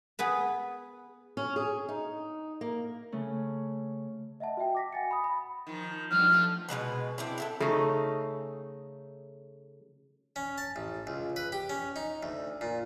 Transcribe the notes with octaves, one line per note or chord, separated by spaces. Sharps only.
B3 G#4 B4
C#4
G#4
D#4
A#3
C#3 A3 C#4
D#5 E5 F#5 A5
F#4 D#5 E5 G5
D6 A#6 B6
F#5 G#5 A6 C#7
B5 D#6
B5
D#3 F3
G2 B2 F3 F6
F3 A3
B2 D#3 G#3 B4
C4 D4 E4
E4 F4 A4
C#3 A3 D#4
C#4
A5
A1
C#2
B4
G4
C#4
D#4
D2
A#2